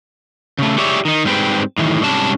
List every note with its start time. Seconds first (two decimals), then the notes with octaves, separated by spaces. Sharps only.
0.59 C#3 A3
0.78 G4 G#4 C#5 D5 E5
1.05 D#3 D#4
1.25 G#2 G3 C4 B4 G5
1.78 A2 D#3 E3
2.03 G#2 C3 G3 C#4 D4 A5